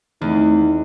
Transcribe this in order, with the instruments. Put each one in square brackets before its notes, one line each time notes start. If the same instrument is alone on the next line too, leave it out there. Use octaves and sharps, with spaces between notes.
[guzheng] E2 [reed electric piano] D#3 A3 C4 [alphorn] D#4